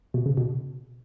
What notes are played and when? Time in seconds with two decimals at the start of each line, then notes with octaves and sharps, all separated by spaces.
0.14 B2
0.26 C#3
0.37 B2